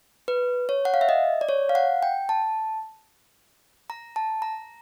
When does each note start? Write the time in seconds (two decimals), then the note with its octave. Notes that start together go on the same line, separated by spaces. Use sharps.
0.28 B4
0.69 C#5
0.85 F#5
0.94 F5
1.01 E5
1.09 D#5
1.41 D5
1.49 C#5
1.69 F5
1.75 F#5
2.03 G5
2.29 A5
3.90 A#5
4.16 A5
4.42 A#5